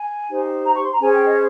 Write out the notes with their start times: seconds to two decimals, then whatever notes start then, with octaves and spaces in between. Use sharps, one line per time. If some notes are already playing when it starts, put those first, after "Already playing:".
Already playing: G#5
0.30 D#4 G4 C5
0.66 A#5
0.75 C#6
0.84 C6
0.93 A#5
1.01 C#4 G#4 C5 G#5
1.14 G5
1.25 D#5